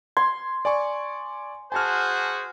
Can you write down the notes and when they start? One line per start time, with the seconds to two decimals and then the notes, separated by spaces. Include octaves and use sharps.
0.17 C6 G#6
0.65 D5 G#5 C#6
1.72 F#4 G#4 C5 G#5 A5 F6